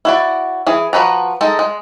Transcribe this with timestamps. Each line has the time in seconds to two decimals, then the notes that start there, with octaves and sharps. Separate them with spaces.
0.05 E4 F#4 D5
0.67 E3 G#4
0.93 F3 F#4 B4 A#5
1.41 G#3 D#4 A4
1.59 G#3